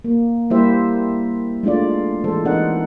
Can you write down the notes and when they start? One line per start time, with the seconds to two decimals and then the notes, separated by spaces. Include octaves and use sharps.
0.04 A#3
0.50 G3 A#3 E4 G4 C5 E5
1.63 G#3 A3 D4 F4 D5
2.24 E3 G#3 A4 C5
2.45 E3 C4 D#4 A#4 D5 F#5